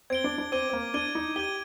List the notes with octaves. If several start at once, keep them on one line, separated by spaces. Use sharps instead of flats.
C4 G#6 D7 G7
D4
D4
C4 D6 G#6 D#7 G7
C4
A#3
D4 G#6 D#7 G7
D#4
G4 G#6 D#7 G7